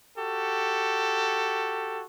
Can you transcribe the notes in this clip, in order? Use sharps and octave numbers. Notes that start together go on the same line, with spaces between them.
F#4 G4 A4